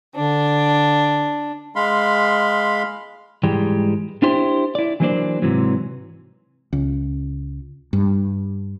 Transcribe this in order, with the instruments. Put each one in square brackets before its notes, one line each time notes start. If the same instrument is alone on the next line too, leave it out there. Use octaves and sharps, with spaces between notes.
[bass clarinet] D3 [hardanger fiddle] D4
[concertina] G#3 F5 B5 C6
[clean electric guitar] G#2 E3 G3 G#3 G4
D4 E4 G4 C5
E4 D5
E3 F#3 A#3 D4 C5 D5
G#2 C3 E3 F#3
[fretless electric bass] C#2
G2